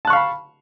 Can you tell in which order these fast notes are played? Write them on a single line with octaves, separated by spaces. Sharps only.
A5 F#6 C#6 F5 B5